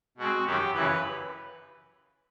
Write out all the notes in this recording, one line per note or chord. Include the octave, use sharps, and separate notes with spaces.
B2 G#3 C4 F#4
F#2 D#3 F#3 G4
F#2 C#3 E3 B4